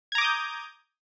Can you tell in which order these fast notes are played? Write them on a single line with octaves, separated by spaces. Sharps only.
G#6 A#5 D6 D#6 G6